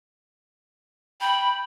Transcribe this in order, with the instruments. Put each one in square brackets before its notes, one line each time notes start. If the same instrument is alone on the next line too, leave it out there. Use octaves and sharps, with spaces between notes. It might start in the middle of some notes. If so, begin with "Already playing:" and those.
[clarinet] G5 [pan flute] B5